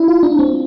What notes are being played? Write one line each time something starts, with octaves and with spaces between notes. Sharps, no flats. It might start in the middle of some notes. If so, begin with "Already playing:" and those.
Already playing: D4 E4
F4
D4
C4